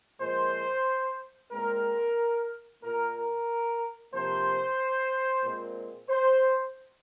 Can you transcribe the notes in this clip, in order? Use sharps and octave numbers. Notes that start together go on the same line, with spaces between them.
A#2 F3 G#3 C5
A#2 G#3 C4 A#4
A#2 A#3 A#4
A#4
C3 F3 A#3 C5
A#2 G#3 C4
C5